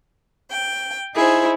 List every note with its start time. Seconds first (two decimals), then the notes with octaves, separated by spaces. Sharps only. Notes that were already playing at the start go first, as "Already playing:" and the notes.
0.51 G5
1.15 D#4 E4 G#4 C5